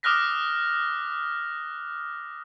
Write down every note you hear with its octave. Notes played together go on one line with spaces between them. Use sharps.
D6 D#6 F6 F#6 A#6 B6